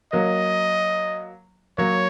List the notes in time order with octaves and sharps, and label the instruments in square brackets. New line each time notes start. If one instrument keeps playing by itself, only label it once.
[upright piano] F#3 A#3 [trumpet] D#5
[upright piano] F#3 A#3 [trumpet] C#5